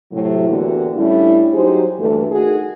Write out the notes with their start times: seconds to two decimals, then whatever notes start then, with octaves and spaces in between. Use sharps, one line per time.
0.12 A2 C3 F#3
0.49 E2 D3 E3 A#3 F#4 G4
0.97 A2 G3 C#4 D4 E4
1.53 F#3 D#4 G4 G#4 C5
1.99 D2 G2 E3 A3 A#3 A4
2.31 D#3 F#4 G#4